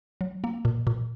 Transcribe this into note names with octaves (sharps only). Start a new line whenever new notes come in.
F#3
A#3
A#2
A#2